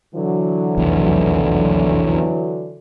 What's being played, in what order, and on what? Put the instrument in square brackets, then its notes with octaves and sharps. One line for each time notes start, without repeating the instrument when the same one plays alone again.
[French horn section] D3 E3 F#3
[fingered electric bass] F1 B1 E2